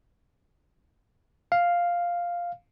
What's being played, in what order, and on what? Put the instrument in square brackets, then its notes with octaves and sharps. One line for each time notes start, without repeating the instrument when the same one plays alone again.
[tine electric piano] F5